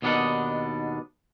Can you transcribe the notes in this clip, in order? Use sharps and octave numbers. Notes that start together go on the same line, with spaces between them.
D#2 B2 B3 D4 D#4 F#5